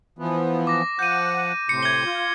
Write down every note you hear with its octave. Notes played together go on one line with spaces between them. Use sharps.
E3 F3 B3
D6 A#6
F3 F#5 G6 D#7
A2 C3 C6 C#7
G#6 G7
F4